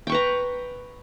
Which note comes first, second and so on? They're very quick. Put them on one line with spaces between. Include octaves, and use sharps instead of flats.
G5 C#6 B4 A#5